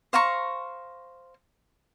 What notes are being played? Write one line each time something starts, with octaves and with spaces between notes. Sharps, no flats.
C5 F5 A#5 C#6